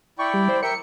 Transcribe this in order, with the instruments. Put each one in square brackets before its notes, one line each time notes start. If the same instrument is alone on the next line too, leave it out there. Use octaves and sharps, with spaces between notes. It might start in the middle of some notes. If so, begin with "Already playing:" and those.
[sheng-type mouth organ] E4 D5 G5 [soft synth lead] C#6
[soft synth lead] G3
C5
[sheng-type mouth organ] A#4 E5 G5 [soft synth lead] C#7